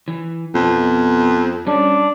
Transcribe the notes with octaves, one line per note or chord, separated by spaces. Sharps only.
E3
F2 B2 B3
G3 C#4 D4